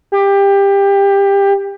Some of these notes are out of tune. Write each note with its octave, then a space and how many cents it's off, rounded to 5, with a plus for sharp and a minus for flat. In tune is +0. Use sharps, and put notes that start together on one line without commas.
G4 +20